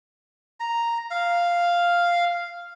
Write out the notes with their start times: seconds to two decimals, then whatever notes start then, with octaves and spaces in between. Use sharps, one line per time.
0.60 A#5
1.11 F5